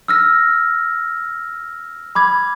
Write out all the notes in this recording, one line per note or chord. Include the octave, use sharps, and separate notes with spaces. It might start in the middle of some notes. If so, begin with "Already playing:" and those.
E6 F6 A#6
B5 D6 G#6